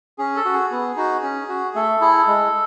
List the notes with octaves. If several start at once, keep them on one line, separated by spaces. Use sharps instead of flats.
C#4 G#4
A4
F#4
G#4
B3
D#4 F#4
C#4
F#4
A3 A4
E4 G#4
G#3